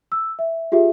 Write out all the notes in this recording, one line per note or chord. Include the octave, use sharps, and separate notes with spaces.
E6
E5
F4 G4 G#4 E5